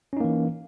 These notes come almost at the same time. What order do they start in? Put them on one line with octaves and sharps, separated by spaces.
C#4 D#4 A#3 E3